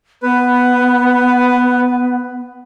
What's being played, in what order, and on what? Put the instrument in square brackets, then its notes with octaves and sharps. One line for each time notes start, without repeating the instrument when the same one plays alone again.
[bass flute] B3 [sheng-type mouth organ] B4